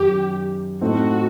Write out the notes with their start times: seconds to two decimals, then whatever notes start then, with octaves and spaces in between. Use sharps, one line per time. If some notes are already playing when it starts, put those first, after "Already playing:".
Already playing: F#2 D#3 G4
0.81 A2 A3 C4 D#4 F#4